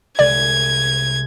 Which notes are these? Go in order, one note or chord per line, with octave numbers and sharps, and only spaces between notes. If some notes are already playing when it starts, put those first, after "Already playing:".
C2 G#3 D5 G#6